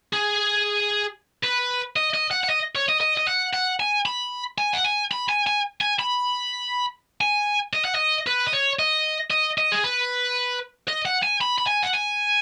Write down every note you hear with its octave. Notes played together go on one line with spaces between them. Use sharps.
G#4
B4
D#5
D#5
F#5
F#5
D#5
C#5
D#5
D#5
D#5
F#5
F#5
G#5
B5
G#5
F#5
G#5
B5
G#5
G#5
G#5
B5
G#5
D#5
F#5
D#5
B4
D#5
C#5
D#5
D#5
D#5
G#4
B4
D#5
F#5
G#5
B5
B5
G#5
F#5
G#5